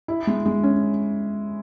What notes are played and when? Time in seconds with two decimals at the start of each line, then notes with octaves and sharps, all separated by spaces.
0.08 E4
0.27 G#3
0.46 G#3
0.63 C#4